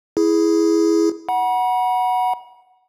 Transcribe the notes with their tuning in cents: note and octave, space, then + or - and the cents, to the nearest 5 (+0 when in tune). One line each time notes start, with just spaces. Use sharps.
E4 +0 G#4 +5
F#5 +0 B5 -45